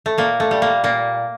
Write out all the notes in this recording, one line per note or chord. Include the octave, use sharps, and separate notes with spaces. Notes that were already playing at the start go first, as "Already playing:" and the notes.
A3
A#2 A#3
A3
G3
A#3
A#2 A#3